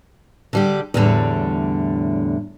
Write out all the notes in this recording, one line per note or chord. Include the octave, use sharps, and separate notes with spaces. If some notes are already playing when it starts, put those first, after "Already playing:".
D3 G3 G4
E2 A2 D3 G3